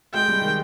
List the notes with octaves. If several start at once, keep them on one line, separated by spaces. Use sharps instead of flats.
G#3 G5
G3
D#3